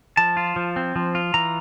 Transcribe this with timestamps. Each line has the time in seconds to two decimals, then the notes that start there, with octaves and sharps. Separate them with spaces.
0.17 F3 A5
0.37 F4
0.56 F3
0.76 C4
0.96 F3
1.15 F4
1.34 E3 A#5